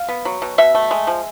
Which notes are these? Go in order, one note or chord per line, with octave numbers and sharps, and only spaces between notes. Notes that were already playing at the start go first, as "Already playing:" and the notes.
Already playing: F5
B3
F#3
B2
B2 E5
A3
G#3
F3